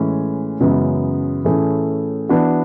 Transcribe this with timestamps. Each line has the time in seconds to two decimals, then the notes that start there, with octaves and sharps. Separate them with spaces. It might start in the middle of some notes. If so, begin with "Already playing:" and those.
Already playing: A2 E3 G#3 C#4
0.60 F#2 C#3 E3 G#3 B3
1.45 A2 E3 A3 C#4 G#4
2.29 E3 B3 D4 F#4